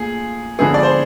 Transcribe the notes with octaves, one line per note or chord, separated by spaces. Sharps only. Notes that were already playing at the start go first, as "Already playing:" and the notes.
Already playing: A#2 A3 G#4
D3 F3 G#3 B3 G#4
D5
C5